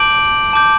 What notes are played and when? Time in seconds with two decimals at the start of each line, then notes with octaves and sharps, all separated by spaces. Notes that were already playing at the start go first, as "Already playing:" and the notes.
Already playing: A5 D6 G6 D7 F#7
0.53 A5 D6 G6